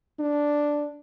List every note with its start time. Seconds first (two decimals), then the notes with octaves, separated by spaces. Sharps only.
0.20 D4